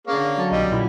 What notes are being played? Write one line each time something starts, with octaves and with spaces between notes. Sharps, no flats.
D3 A#3 C#4 G#4 C#5 F5
F#3 A4
B1 G3 D#5
A#2 E4